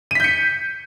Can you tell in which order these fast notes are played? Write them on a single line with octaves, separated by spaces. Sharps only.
D#7 B6 G6 C#7